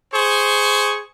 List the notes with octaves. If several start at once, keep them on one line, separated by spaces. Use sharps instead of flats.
G#4 C5 C#6